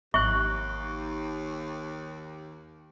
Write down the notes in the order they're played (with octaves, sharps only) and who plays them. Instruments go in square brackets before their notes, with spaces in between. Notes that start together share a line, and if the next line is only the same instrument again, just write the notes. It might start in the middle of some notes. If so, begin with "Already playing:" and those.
[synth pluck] G#1 F#6 [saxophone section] D#2 [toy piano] C#6